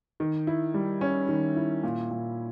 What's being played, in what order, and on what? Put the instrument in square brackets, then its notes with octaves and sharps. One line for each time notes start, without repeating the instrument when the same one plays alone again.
[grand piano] D#3
E4
G3
C#4
D#3
E4
A#2
A#2